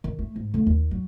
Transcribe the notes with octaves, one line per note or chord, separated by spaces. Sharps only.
D#3
A3
G#2
D3 A3
D#2
F#3